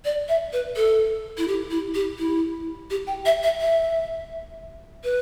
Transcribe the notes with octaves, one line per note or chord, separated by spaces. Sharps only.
D5
E5
B4
A4
E4
G4
E4
G4
E4
G4
G5
E5
E5
E5
B4